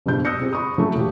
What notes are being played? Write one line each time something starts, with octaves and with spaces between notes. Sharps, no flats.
F#1 G2 B2 G4 G6
D#6 E6 F#6 G6 A#6 C#7
C4 G4 G#4
B5 C#6 D#6
F#3 A3 C#4
E1 A#2 G4